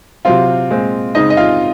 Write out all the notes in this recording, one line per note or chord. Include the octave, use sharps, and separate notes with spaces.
C3 F#3 C4 F4 F5
A#2 G#3 C4
C#3 G#3 C4 D#4 D#5
D#5
F4 F5